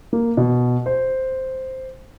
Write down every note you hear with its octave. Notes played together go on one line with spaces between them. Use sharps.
A#3
B2
C5